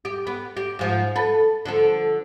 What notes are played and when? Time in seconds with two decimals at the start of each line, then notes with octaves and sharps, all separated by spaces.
0.05 G4
0.27 B3
0.57 G4
0.79 G#2 F3
1.16 A4 B4
1.65 D3 F3 A4